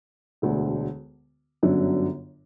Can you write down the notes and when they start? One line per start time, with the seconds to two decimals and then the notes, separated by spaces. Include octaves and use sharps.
0.42 E1 D2 D3
1.63 G1 F#2 D3 F#3